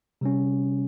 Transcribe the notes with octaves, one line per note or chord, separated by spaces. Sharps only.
C3 G3 C#4